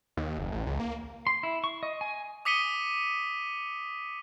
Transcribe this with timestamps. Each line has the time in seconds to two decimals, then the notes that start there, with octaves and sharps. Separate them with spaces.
0.17 D#2
0.38 F#1
0.52 A1
0.66 C#2
0.80 A#3
1.27 C6
1.43 E4
1.64 C#6
1.83 D#5
2.01 G#5
2.45 D6 D#6 B6 C#7 D#7 G7